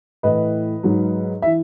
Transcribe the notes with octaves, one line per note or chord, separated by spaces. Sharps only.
A2 E3 B4 D#5
G#2 F#3
E5
E3